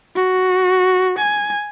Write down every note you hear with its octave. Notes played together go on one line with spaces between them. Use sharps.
F#4
G#5